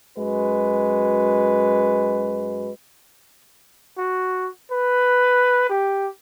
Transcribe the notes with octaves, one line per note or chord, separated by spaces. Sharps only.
F#2 G#3 F#4 B4
F#4
B4
G4